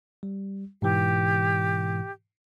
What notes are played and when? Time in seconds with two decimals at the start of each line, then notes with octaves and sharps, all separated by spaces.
0.23 G3
0.82 G#2 B2 E3 G4